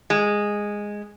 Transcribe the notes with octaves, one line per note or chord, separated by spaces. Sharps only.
G#3